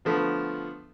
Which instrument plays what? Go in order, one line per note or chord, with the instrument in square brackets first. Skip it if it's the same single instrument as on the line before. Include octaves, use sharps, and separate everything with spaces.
[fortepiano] D3 F3 A3 B3